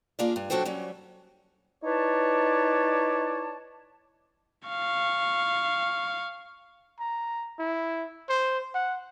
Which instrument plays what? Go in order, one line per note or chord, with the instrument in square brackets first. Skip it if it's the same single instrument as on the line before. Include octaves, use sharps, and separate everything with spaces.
[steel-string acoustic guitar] A#3 D4 F4 G#4 A#4 D5
G2
F#3 D4 F#4 A4 C5 G5
F#3 G3 C#4
[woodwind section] D#4 E4 B4 C#5 D5 A5
[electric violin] F5 C#6
[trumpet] A#5
E4
C5
F#5